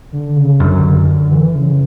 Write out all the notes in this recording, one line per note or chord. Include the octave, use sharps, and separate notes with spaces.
D3
C#3
F#2 D3
E3
C#3